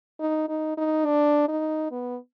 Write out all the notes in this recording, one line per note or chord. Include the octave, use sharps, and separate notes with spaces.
D#4
D#4
D#4
D4
D#4
B3